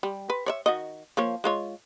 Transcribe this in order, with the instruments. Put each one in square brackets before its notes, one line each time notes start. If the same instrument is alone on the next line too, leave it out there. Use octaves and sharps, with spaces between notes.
[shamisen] G3
B4
C#5 D5 E5
D#3 F#4 D#5
F3 A#3 C#5
G#3 F4 C#5